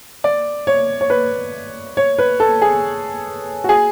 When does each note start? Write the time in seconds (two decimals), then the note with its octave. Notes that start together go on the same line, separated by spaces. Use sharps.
0.24 D5
0.67 C#5
1.01 C#5
1.10 B4
1.97 C#5
2.19 B4
2.40 A4
2.62 G#4
3.64 F#4
3.69 G#4